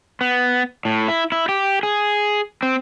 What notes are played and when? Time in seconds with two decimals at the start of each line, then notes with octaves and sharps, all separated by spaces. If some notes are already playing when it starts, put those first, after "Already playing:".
0.21 B3
0.85 A2
1.08 E4
1.32 E4
1.49 G4
1.83 G#4
2.63 C4